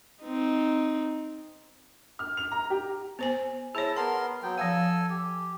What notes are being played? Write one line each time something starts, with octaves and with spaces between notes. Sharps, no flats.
C4 D#4
F6
F7
A#5
G4
B3 C5 G#5
E4 G#4 C#5 A5
B3 A#4 A5 C6
F#3 B3 G5
F3 A4 F5 G#5 E6
G4